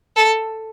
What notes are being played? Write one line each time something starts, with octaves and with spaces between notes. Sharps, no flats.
A4